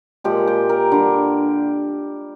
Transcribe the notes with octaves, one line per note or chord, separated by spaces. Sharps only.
A#2 F3 G#3 G4
G4
A#4
D3 G3